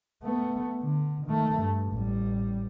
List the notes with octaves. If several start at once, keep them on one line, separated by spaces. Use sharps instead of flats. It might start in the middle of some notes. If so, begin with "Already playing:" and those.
A3 B3
D3
D#3 A3
G2
A1 G3